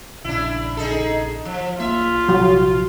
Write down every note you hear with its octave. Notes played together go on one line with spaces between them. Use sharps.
A#1 C#3 D4 E4
D#4 G#4 A4
F3
B1 A#3 F4 E5
A#1 C3 F3 F#3